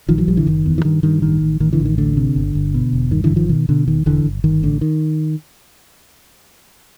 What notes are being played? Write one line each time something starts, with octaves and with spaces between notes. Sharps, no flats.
A#1 D#3 F3
E3 F#3
A#1 F3 G3
D3 E3
F#1 D#3
E2
E3
G2 D#3
G2 D#3
A1 D#3
A1
A1 D#3
D3 E3
A1
D#3
D2 D3
C3
G1
G1
B2
E1
G2 D#3
D3 E3
G1
D#3 F3
B2 D#3
B2 D3
E1 D#3
E1 D3 E3
G1
G1 D#3
A1 D3
D#3